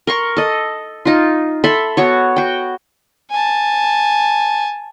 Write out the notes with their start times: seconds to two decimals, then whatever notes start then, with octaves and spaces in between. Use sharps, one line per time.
0.07 A#4 C6 C#6
0.37 A4 D#5
1.05 D#4 F4
1.64 A4 E5 B5 C6
1.97 B3 F#4 C#5
2.36 F#4 G5
3.31 G#5 A5